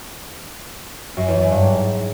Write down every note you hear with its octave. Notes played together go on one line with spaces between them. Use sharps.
F#2
E2
F#2
G2
G#2